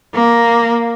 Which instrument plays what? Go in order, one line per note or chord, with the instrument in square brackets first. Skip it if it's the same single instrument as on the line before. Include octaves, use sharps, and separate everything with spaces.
[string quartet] A#3